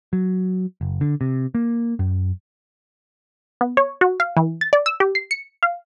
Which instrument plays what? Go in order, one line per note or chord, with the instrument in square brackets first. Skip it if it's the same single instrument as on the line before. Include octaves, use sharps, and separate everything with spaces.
[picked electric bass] F#3
F#1
D3
C3
A#3
F#2
[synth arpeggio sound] B3
C#5
F#4
F5
E3
A6
D5
E6
G4
C7
C#7
F5